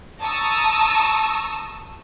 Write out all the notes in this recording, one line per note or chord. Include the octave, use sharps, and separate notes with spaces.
A5 A#5 C#6 D#6 E6